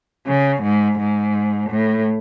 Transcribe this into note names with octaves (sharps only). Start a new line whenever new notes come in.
C#3
G#2
G#2
A2